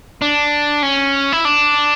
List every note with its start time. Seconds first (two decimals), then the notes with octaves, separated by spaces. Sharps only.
0.22 D4
0.83 C#4
1.32 E4
1.45 D4